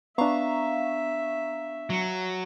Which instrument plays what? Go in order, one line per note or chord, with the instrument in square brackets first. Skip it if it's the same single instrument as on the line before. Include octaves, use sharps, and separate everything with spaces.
[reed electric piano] B3 D4 [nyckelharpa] E5 [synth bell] F5 A#5 C#6
[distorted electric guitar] F#3